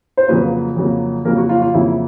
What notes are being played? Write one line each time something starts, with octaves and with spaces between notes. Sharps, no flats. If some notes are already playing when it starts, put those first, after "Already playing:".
C5
F2 C#3 F#3 A#3 B4
F2 C#3 F#3 A#3
F2 C#3 F#3 A#3 A#4
F#4
F4
F4
F2 C#3 F#3 A#3 E4